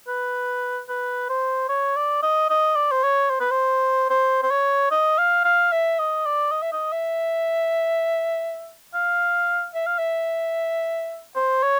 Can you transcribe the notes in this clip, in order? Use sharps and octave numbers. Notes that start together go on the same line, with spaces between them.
B4
B4
C5
C#5
D5
D#5
D#5
D5
C5
C#5
C5
B4
C5
C5
C5
C#5
D#5
F5
F5
E5
D#5
D5
D#5
E5
D#5
E5
F5
E5
F5
E5
C5
C#5